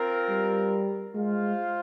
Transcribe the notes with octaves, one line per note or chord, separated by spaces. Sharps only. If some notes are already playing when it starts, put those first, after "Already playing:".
Already playing: C4 F4 A#4
G3
G#3 F4 C5 F5